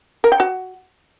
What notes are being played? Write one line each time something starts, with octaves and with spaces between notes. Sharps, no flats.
A#4
G5
F#4